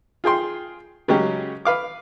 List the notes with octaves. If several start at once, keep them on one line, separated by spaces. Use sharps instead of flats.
F4 G#4 G5 C6
C#3 F#3 G#3 C#4 G4
B4 F5 D6